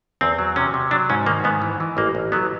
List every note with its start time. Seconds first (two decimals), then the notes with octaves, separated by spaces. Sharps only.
0.21 E2 C4
0.39 F#3
0.56 C3 C#4
0.74 C3
0.91 F#3 D4
1.10 G#2 C#4
1.26 D#3 A#3
1.44 G#2 B3
1.62 E3
1.80 E3
1.97 A1 A#3
2.15 A1
2.32 F#3 B3